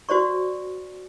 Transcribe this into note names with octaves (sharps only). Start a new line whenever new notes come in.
F#4 C5 D5 C#6